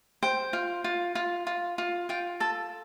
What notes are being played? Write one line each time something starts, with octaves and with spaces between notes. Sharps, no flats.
C5 G5
F4
F4
F4
F4
F4
F4 G5
A4 A5